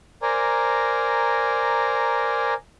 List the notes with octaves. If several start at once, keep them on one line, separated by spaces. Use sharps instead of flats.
A#4 C5 D5 G#5 A#5